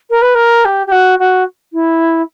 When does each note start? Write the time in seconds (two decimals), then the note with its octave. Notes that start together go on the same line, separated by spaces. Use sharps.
0.10 A#4
0.22 B4
0.35 A#4
0.65 G4
0.87 G4
0.92 F#4
1.19 F#4
1.73 E4